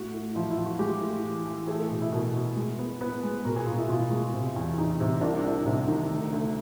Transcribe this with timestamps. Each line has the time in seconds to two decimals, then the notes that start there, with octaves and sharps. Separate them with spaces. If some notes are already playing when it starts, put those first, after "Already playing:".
Already playing: A2 F#4
0.14 A2
0.35 F3 E4
0.51 E4
0.58 F3
0.65 F#4
0.79 G#3 G4
1.01 A2
1.23 E3
1.45 E3
1.67 A3 G#4
1.79 A4
1.91 B2
2.01 E4
2.13 B2 A#4
2.34 B2
2.56 G#3
2.79 B3
3.01 B3 B4
3.23 G#3
3.45 B2 A#4
3.56 G#4
3.66 B2 F4
3.77 E4
3.89 B2 F4
4.11 G#3
4.34 C3
4.56 E2
4.78 E2 D#4
5.00 C3
5.21 C2 D4
5.44 C2 D4
5.66 C3 D#4
5.88 D#3 D#4
6.10 D2
6.33 D2